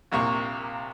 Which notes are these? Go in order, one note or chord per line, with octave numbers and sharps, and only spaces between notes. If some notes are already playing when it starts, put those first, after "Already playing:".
A#1 C3 A#3 C#6